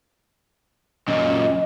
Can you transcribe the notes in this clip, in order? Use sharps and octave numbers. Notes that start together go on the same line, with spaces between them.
F#2 A#2 D#5